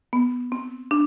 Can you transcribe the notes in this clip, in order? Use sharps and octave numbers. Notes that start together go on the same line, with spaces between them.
B3
C4
D4